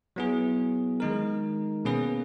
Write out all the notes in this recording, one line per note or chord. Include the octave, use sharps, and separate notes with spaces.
F#3 B3 E4 G#4
D#3 G#3 D#4 A#4
B2 A#3 C#4 G#4 B4